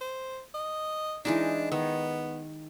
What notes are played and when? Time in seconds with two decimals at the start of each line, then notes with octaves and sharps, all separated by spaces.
0.01 C5
0.54 D#5
1.25 E3 G#3 D4 D#4
1.72 D#3 B3